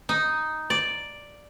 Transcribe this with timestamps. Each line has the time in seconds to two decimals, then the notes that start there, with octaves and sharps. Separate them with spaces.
0.09 D#4
0.70 D5